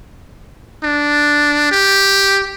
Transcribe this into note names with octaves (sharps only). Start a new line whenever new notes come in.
D4
G4